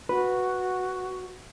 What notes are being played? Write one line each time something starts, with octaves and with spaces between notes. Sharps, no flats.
F#4 B4